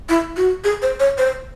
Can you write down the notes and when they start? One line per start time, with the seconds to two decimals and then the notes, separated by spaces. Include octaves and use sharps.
0.09 E4
0.37 F#4
0.64 G#4
0.82 C5
1.00 C#5
1.18 C5